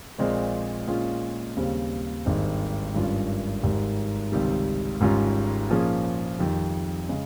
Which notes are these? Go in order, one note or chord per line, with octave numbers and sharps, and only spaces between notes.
A#1 A#2 G#3 C4
A#2 G#3 C#4 F4
D#2 C#3 G3 C4
G#1 G2 D#3 G#3 C4
G#1 G2 G3 C#4 F4
G#1 G#2 G3
C#2 C3 D#3 G3
G#1 G#2 G3 C#4 F4
A#2 F3 A#3 C#4 G#4
F2 D#3 G3
C#3 G#3